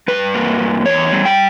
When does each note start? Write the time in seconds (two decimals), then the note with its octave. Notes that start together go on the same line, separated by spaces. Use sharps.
0.08 G2 B4
0.34 A#3
0.60 G2
0.86 E2 C#5
1.13 G3
1.26 G5